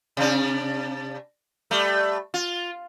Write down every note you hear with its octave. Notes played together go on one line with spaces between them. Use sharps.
C3 D4
G3 A3
F4